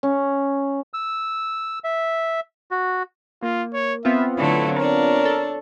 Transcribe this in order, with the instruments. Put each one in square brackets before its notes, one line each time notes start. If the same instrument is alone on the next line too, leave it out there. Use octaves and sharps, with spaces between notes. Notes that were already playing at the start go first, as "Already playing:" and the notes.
[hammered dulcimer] C#4
[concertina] E6
E5
F#4
[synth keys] A#3 [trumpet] F4
[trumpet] C#5
[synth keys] B3 C4 F4 [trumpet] E5
[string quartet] D3 F#3 A3 [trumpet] E4
[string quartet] D4 C#5 [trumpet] A#4
[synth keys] A4